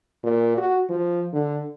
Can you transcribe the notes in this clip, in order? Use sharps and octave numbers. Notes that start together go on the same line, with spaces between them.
A#2
F#4
F3
D3